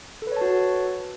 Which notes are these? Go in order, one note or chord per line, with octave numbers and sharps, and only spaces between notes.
F#4 A4 B4 C#5 A5